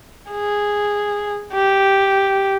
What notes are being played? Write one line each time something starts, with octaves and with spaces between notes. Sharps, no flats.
G#4
G4